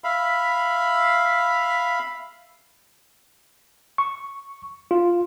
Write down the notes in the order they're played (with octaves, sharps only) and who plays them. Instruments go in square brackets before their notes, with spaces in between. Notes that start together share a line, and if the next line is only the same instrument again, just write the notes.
[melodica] E5 F5 B5
[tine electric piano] C#6
F4